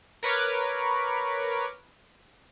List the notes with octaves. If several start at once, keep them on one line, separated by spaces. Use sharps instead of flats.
A#4 B4 C#5 D6